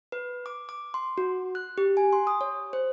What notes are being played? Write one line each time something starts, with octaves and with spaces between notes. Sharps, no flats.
B4
D6
D6
C6
F#4
F#6
G4
G#5
C6
D#6
C#5
C5